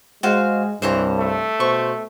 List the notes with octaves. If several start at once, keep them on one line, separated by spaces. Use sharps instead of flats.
G#3 F#4 C5 F5
C2 G2 E3 C5 C#5 A#5
A3
B2 C5 C#6